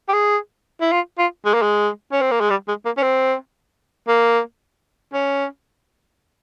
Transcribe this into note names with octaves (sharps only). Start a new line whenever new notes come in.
G4
G#4
E4
F4
F4
G#3
A#3
G#3
C#4
C4
A#3
G#3
G3
G#3
A#3
C#4
C4
A#3
C#4